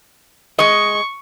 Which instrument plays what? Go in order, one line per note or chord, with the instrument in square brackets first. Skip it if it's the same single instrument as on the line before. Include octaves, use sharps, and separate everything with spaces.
[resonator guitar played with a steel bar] G#3 D#5 [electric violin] C#6